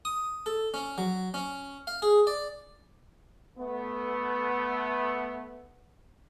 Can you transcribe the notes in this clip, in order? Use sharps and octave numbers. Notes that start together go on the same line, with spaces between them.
D#6
A4
C#4
F#3
C#4
F5
G#4
D5
A3 B3